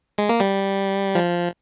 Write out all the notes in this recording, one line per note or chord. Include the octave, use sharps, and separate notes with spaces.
G#3
A#3
G3
F3